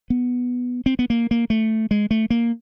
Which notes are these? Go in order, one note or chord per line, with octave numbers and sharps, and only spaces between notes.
B3
C4
B3
A#3
A#3
A3
G#3
A3
A#3